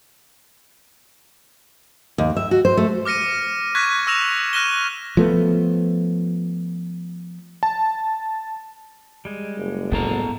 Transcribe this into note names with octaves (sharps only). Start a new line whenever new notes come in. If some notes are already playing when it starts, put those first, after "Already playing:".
D#2
E5
F#4
C5
A3
D6 F6 A#6 C#7 D#7
C#6 F#6 G#6 A#6 B6
C#6 E6 A#6 E7 F7
F6 F#6 A#6 D#7 E7 G7
F3 A3 B3
A5
G3 G#3
F#1
A2 B3 A4 A#5